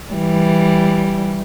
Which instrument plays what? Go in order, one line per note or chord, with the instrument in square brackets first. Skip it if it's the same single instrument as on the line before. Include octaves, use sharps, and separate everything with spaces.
[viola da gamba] E3 G3